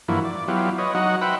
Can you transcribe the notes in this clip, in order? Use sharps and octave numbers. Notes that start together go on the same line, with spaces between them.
G2 E3 F3 A#3 E4 F#4
D5
F#3 B3 E4 F4 G4
B4 C#5 D#5
F#3 D#4 F#4 D#5 F#5
B4 C5 E5 F#5 G5 B5